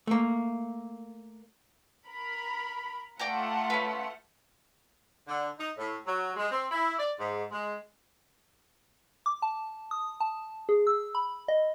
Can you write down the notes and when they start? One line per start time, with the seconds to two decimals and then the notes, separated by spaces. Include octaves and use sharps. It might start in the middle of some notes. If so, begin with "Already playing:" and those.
0.07 A3 A#3
2.07 A#4 B5
3.19 A3 F4 D5 F#5 G5 A#5
3.70 C#4 B4
5.26 D3
5.58 D#4
5.77 A2
6.06 F#3
6.36 G#3
6.51 C4
6.71 E4
6.98 D5
7.19 G#2
7.51 G#3
9.26 D6
9.42 A5
9.91 D#6
10.20 A5
10.69 G#4
10.87 E6
11.15 B5
11.48 D#5